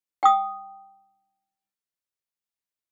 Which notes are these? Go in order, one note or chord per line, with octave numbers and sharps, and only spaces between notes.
G5 D#6